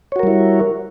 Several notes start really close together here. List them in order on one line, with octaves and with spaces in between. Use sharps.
C#5 F#4 A#4 G3 E4